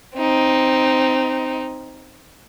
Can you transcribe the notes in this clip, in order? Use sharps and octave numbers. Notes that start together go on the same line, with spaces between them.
C4 D#4